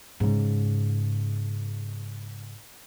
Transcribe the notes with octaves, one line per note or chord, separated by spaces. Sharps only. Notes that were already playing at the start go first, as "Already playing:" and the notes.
G#2 C#3